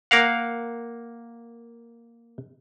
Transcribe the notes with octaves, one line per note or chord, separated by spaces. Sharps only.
A#3 A#4 F5 F#5